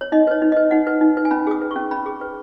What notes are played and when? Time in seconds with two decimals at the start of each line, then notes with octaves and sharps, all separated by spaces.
0.01 C#5
0.12 D#4 D#5
0.27 B4 C#5
0.42 D#4
0.52 D#5
0.57 B4
0.71 D#4 F#5
0.87 B4
1.01 D#4
1.17 B4
1.25 G#5
1.31 C#4 B5
1.47 G#4 D#6
1.62 B4
1.71 C#6
1.76 C#4
1.91 C#4 B5
2.06 G#4
2.21 B4